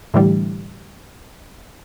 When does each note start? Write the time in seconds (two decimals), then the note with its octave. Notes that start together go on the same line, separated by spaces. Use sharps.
0.14 A2 D3 E3 G3